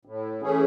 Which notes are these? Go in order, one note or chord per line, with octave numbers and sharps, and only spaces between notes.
A2
E3 A3 C#4 G#4